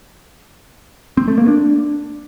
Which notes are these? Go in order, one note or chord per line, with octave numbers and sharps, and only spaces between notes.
C4
A3
A#3
D4